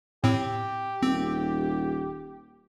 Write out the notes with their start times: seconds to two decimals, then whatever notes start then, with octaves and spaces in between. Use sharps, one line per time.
0.24 A2 C4 G4
1.02 D#1 C4